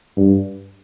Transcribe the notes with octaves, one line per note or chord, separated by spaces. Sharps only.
G2